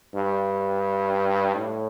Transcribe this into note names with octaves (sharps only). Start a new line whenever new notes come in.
G2
A2